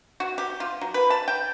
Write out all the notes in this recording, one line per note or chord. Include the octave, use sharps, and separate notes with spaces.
F#4
G4
F4
F#3
B4
A5
G5